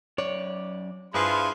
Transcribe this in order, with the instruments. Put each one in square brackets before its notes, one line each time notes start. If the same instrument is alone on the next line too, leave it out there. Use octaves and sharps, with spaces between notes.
[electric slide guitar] F#2 D5 [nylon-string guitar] C#5
[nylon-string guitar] G2 [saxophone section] F3 B4 [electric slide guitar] E4 [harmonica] F4 G#4 C6